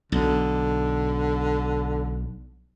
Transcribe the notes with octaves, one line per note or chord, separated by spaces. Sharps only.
B1 D3